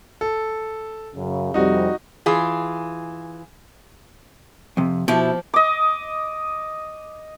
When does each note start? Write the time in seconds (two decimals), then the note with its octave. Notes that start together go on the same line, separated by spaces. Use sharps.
0.21 A4
1.15 F#2 C#3
1.54 F2 C3 G3 D#4 F#4
2.26 E3 F4 G#4
4.77 F2 C3
5.08 B2 F3 E4 G4
5.54 D#5 D6